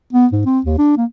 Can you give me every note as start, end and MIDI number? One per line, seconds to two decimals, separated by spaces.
0.13 0.27 59
0.32 0.42 44
0.46 0.60 60
0.65 0.77 39
0.78 0.97 62
0.97 1.05 58